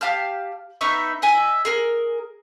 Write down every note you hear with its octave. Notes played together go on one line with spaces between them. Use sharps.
G4 F5 A5 F6
B3 D#4 E5 C#6
D#5 E5 G#5
G#4 A#4 F6